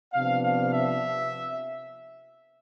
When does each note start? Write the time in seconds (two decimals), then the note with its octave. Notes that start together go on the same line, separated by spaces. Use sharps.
0.13 C3 F3 B3 D4 F5
0.43 F5
0.73 E5